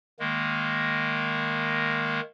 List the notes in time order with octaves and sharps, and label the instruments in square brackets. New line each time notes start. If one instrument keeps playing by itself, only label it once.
[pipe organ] D#3 G#3 A#3